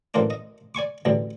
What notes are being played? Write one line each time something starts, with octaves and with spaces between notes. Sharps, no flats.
F#2 A2 E3 A#3 C4 D4
D#5
D5 G#5 C#6 D6
A1 B2 D3 G3